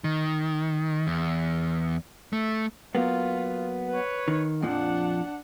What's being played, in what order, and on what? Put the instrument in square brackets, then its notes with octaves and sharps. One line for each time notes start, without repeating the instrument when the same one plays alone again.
[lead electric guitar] D#3
E2
A3
[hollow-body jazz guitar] F#3 A#3 B3 [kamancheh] F4
[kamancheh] B4 C#5
[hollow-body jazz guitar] D#3
[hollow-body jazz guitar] F2 A#2 F3 [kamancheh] D4 F#5